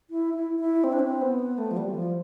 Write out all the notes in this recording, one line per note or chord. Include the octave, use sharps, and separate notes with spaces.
E4
E4
E4
C4
D4
C4
B3
A3
F3
G3
E3
F3